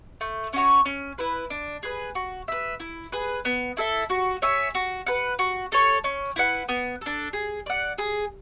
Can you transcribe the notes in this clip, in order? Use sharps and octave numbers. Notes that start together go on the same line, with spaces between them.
A3
C#4 F#4 C#5
C#4
E4 B4
D4
G#4 B4
F#4
B4 E5
E4
G#4 B4
B3
E4 A4 E5
F#4
C#5 E5 G#5
F#4
B4 F#5
F#4
A4 C#5
C#4
E4 B4 F#5
B3
D4 A4
G#4
D5 F#5
G#4